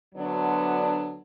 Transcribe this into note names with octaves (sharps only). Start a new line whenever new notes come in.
D2 D3 F#3 B3 D4